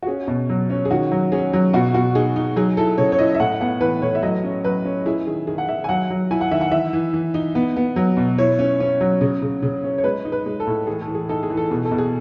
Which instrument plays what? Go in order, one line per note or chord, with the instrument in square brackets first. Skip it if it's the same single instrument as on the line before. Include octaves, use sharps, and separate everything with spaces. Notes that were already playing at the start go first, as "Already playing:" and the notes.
[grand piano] F#4
C#4 G#4
B2
F#3
C#4
G#4
D#3 F#4
F#3
C#4 G#4
F#3
B2 F#4
B2 F#4
D#4 G#4
D#4
F#3 G#4
E4 A4
C#3 C#5
C#5
E4 D#5
E5
A2 F#5
B3 F#5
E3 B4
A2 C#5
E5
F#3 D#5
C#4
F#3 B4
C#4
E4 G#4
D#3 G#4
D#3 G#4
F#5
D#3 E5
G#5
F#3 F#5
F#3
E4 G#5
F#5
D#3 E5
F#5
E3 E5
E3
E3
D#4
B3
B3
F#3
B2
E4 C#5
C#4
C#4
F#3
C#3
C#3
C#3
C#4
C#5
G#3 B4
D#4
B4
G#3
A4
A2
E3 G#4
A4
E3
G#4
D#4 A4
G#4
E3
A4
B2 G#4
A4
B2
G#4